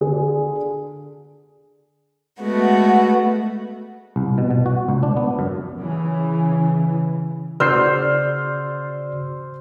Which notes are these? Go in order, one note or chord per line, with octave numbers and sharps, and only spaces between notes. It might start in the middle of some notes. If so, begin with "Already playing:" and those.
D3 G#4
G#3 A3 B3 F#4
C2
B2
B2
F#4
C#2
D4
B3
F#2
C#3 E3
C#3 F#4 C5 D5 E6 F6 G6 C7